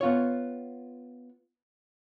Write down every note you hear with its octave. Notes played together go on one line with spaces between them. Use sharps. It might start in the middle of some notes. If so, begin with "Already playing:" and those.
B3 F4 C#5